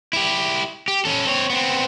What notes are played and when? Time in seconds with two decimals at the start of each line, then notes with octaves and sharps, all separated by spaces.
0.13 E4 G4
0.88 G4
1.05 C#4 A4
1.27 C4 C#5
1.50 B3 C4